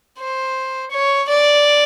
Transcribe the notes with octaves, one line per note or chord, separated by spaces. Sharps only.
C5
C#5
D5